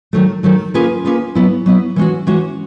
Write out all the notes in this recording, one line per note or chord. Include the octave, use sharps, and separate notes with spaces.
D#3 F#3 A3
D#3 F#3 A3
A#3 C#4 F4 G#4 B4
A#3 C#4 F4 G#4 B4
F#3 B3 E4
F#3 B3 E4
E3 G#3 C#4 F#4
E3 G#3 C#4 F#4